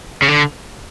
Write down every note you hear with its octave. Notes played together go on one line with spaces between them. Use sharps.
C#3
D3